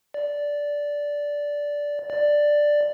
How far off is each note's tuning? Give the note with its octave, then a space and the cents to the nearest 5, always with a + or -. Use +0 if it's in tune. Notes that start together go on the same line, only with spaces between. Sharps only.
D5 -10
D5 +5